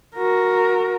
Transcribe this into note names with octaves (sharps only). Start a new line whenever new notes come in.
F#4 A#4